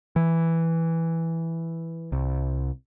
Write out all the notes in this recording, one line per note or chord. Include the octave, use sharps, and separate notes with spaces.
E3
C2